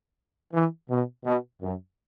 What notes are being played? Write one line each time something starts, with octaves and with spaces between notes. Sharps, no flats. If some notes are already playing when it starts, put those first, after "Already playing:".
E3
B2
B2
F#2